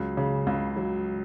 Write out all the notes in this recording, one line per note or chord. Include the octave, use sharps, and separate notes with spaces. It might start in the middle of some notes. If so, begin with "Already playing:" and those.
Already playing: C#2 F#3
C#3
C#2
F#3